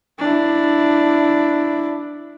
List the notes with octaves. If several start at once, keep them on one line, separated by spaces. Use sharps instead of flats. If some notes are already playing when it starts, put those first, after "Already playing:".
D4 E4